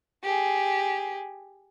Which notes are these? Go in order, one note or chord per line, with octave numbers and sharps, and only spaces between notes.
G4 G#4